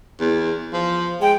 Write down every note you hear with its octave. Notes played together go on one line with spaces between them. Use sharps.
E2
F3
G#3 G5